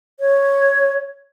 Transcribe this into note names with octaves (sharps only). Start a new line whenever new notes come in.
C#5